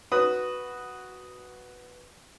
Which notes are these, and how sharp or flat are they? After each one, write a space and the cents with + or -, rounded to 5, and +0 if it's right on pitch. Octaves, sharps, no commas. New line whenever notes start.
F#4 +0 B4 +0 D#6 +0